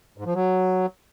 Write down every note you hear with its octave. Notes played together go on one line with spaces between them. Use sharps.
G#2
F3
F#3